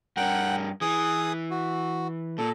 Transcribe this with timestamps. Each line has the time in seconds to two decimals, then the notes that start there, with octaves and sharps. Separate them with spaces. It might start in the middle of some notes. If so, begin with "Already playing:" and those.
0.17 G2 A#4 F#5 G5
0.81 E3 G#4 D#6
1.51 F#4
2.38 A#2 A4